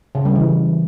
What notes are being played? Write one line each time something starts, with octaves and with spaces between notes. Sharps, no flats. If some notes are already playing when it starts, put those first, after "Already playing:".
C#3
G3
E3